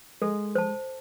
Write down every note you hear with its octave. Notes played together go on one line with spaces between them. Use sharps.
G#3 A4
C5 A5